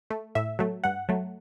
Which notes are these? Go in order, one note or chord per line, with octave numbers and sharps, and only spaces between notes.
A3
A2 E5
F#3 A3
G2 F#5
F#3 A3